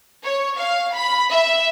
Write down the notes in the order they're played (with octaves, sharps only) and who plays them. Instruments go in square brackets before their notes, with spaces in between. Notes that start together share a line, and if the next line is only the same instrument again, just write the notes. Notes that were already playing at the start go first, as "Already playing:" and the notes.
[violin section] C#5
F5
B5
E5